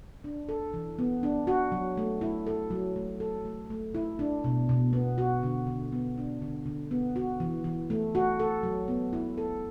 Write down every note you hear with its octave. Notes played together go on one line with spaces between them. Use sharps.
D4
A4
E3
B3
D4
F#4
F#3
A3
E4
A4
F#3
A3
A4
A3
A3
E4
D4
B2
B2
B3
F#4
D3
D3
B3
D4
D3
D3
B3
F#4
E3
E3
A3
F#4
A4
F#3
B3
E4
A4